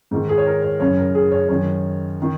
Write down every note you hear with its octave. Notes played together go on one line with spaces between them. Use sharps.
G#2 D#3
G#4
C#5
A#4
C#5
F#2 C#3 C#5
A#4
G#4
C#5
F#2 D#3 C#5
D#3